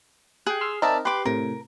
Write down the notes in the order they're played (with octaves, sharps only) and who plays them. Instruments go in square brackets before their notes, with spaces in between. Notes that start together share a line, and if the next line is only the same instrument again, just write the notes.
[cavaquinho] G#4 [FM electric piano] G5 F#6
[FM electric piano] C6 E6 F6
[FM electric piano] C4 D#4 A#4 [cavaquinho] D5 E5 A5
[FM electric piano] G4 C6 [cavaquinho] B4 D6
[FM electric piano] A2 C3 [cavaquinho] A#4